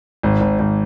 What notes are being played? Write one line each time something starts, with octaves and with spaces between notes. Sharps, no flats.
G#1
G#1
G#1